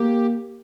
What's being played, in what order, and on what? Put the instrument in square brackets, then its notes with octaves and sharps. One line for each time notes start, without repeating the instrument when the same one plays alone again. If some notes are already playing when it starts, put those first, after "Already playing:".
Already playing: [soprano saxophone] A#3 [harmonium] G4